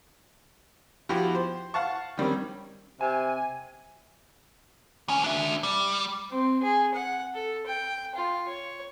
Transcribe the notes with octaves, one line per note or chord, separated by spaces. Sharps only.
F3 B3 E4 F#4 G4
C5
F5 F#5 A5 C#6
D#3 G3 C4 C#4
C3 G#5
D#2 C#4
D4 E5
G3
C4
G#4
F#5
A4
G5
F4
C#5